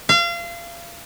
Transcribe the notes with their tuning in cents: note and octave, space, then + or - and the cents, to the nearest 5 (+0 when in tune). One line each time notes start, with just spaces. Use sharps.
F5 -30